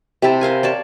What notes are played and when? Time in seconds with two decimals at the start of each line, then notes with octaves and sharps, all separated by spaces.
0.22 C3 C4 E4 A5
0.41 A#4 C5 F5 G#5
0.63 C#5 D5 A5